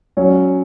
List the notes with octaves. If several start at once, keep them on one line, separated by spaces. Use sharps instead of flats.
F#3 C#4 C#5